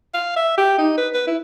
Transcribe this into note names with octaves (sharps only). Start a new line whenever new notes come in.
F5
E5
G4
D#4
B4
B4
E4